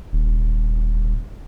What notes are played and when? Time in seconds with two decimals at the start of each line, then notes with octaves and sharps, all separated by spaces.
0.13 D#1